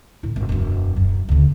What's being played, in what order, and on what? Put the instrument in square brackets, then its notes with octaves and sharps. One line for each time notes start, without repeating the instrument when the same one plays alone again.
[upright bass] A2 E4
G#1
E1 F#2
F#2
D2 C#3